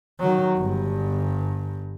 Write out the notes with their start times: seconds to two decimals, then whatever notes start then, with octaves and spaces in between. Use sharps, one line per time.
0.20 D#3 F#3
0.57 G1 G2